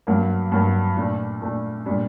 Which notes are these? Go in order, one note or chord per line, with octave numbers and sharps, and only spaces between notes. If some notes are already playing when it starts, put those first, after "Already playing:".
G2 F#3 A#3
G2 F#3 A#3
A#2 A3 D4
A#2 A3 D4
A#2 G3 D4